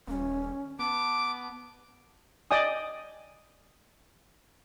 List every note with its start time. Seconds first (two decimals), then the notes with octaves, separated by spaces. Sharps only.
0.07 D#1 C#4
0.79 B3 A5 D6
2.51 D5 D#5 G5 G#5 D#6